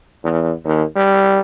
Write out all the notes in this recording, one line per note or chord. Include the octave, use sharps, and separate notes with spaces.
E2
D#2
G3